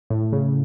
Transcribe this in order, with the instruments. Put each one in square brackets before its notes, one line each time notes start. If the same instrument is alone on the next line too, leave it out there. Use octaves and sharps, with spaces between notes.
[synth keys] A2
C#3